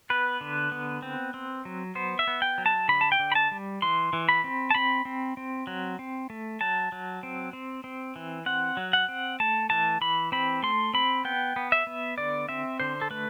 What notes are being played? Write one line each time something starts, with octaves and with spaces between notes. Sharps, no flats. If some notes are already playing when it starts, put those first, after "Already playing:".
B3 B4
D3
B3
C4
C4
F#3
B3 C5
E5
B3
G5
F#3
A5
D3 B5
A5
G5
D3
B5
A5
G3
E3 C6
E3
B5
C4
A5
C4 B5
C4
C4
F#3
C4
A3
F#3 A5
F#3
C4
C4
C4
E3
C4 F#5
F#3
F#5
C4
A3 A5
E3 A5
E3 B5
C4 B5
A3 C6
C4 B5
B3 G5
B3
E5
B3
D3 D5
C4 E5
D3 C5
A4
A3 B4